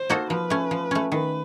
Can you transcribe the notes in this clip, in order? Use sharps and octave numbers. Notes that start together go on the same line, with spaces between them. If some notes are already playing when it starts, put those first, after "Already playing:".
Already playing: C5
A#3 D#4 F#4 A4
F3 B4
A3 C#4
F3
A3 C#4
D#3 B4